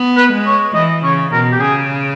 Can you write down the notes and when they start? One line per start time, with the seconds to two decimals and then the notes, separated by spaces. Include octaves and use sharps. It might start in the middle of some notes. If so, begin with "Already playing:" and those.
Already playing: B3
0.17 B4
0.32 G#3
0.46 C#5
0.74 E3 D#5
1.03 C#3 C#5
1.32 B2 A#4
1.52 G4
1.61 C#3 G#4